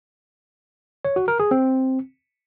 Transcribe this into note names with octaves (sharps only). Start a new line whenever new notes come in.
C#5
F#4
A#4
G#4
C4